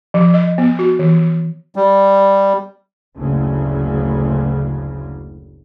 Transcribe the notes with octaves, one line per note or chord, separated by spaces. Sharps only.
F3
D#5
B3
F#4
E3
G3
F#1 D2 A2 C#3